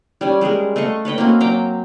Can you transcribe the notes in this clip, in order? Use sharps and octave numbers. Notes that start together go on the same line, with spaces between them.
G3 C#4 G#5
G3 G#3 G#4 A#4
A3 D#5 F5 C#6
B4 C#5 D#5 G5
A#3 C4 C#4 F#4
F#3 G5 A#5 D6